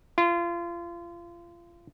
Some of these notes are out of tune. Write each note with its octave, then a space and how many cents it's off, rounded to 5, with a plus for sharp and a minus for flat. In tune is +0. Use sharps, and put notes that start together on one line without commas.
F4 -30